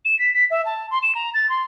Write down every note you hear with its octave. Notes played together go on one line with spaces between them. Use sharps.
E7
B6
B6
E5
A5
C6
E7
A#5
A6
C6